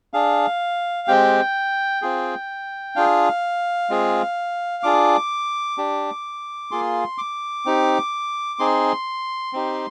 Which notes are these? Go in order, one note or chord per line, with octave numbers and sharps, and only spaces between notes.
D4 G#4 F5
G#3 C4 G4 G5
C4 F4 G#4
D4 F4 G#4 F5
G#3 C4 F4 G#4
D4 F4 G#4 D6
D4 G4
A#3 F4 G#4 C6
D6
C4 D#4 G4
C4 D#4 G#4 C6
C4 D#4 G4